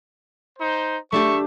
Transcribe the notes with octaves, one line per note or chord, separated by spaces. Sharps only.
D#4 C5
A3 D4 G4 E5 C#6